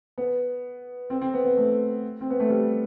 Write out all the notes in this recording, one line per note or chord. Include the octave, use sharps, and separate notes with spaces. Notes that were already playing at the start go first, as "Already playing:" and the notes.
B3
C4
C4
B3
B3
A3
C4
B3
A3
G3